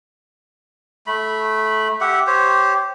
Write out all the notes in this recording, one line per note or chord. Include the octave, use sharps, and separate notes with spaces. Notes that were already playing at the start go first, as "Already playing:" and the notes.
A3 B5
G4 E5 F#5
G4 C5 C#5